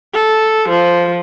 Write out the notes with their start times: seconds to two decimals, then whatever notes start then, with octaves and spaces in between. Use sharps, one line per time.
0.14 A4
0.68 F3